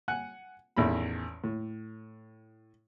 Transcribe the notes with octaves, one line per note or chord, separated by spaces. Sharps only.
F#5 G#5 F#6
A1 E2 D#3 B5
A2